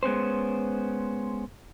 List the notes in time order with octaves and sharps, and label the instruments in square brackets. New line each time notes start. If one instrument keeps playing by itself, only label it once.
[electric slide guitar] G#3 B3 C#4 C5